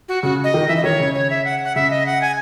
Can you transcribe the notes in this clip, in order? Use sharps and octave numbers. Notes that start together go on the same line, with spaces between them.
F#4
C#3 F#4
D#5
D#3
E3 E5
D#5
D#3 C#5
C#3
C#5
E5
F#5
F#5
C#3 E5
D#5
F#5
G#5